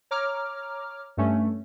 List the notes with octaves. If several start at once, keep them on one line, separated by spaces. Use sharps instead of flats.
C#5 A#5 D6 F6
G2 A3 C#4